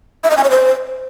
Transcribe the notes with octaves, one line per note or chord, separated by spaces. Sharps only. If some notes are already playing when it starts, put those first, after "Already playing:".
E5
D#5
G#5
C#5
C5